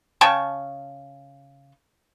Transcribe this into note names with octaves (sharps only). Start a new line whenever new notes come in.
C#3 G5 A5 C#6